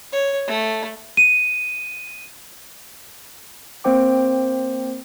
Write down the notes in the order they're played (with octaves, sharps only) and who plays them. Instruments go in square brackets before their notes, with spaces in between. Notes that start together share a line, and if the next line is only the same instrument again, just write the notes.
[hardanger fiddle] C#5
A3
[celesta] D#7
[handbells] A#3 C4 C5 G5 D6